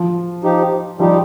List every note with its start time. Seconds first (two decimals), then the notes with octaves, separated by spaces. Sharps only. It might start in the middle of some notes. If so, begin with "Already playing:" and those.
Already playing: F3
0.44 F3 D#4 G4
0.99 F3 G3 D#4 G4